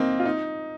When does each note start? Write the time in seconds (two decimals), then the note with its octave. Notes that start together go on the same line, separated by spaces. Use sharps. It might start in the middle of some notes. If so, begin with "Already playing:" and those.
Already playing: A#3 C4 D#4
0.19 F4
0.25 D#4